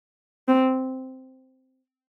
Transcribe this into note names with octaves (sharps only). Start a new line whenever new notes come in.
C4